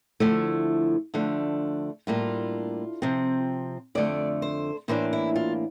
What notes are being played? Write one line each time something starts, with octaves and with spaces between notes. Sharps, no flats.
D3 F3 A3 E4
D3 F3 A3 D4
A2 G3 A#3 D4 F4
C3 F3 C4
F2 D3 A3 D5
C5
A2 E3 A#3 D4 C5
E4
F4